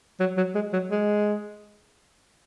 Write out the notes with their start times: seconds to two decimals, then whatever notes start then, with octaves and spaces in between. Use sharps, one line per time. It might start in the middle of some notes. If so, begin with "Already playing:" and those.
0.20 F#3
0.37 F#3
0.55 G#3
0.73 F#3
0.91 G#3